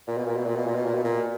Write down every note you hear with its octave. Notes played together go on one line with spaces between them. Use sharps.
A#2
B2
A#2
B2
A#2
B2
A#2
B2
A#2
B2
A#2